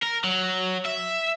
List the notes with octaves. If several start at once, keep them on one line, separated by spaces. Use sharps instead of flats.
A#4
F#3
E5